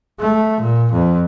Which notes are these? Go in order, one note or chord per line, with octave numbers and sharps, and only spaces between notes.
A3
A#2
F2